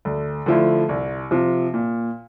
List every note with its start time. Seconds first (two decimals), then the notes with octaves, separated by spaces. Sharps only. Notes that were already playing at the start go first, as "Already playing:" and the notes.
0.05 D2
0.46 D3 F3 A3 E4
0.89 C2
1.31 C3 F3
1.74 A#2